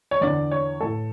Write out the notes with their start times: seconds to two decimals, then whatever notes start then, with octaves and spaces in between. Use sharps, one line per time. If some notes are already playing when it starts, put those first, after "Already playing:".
0.11 C#5
0.21 E2 D3 D5
0.51 C#5
0.81 A2 E3 A4